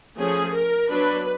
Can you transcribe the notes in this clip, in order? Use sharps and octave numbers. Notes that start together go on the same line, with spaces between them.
F3 A3 C#4 G#4
A#4
F#3 B3 D4 B4